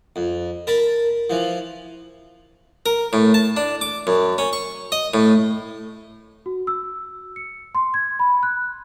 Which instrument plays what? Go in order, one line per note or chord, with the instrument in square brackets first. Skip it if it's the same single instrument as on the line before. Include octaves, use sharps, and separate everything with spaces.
[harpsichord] F2
A#4 A5 B5
E3 F3
A#4
A2
A5
D4
D6
F#2
C#4
C#6
D#5
A2
[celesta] F#4
E6
C#7
C6
G#6
B5
F#6